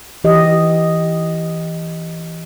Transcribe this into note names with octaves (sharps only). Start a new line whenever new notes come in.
E3 G4 D#5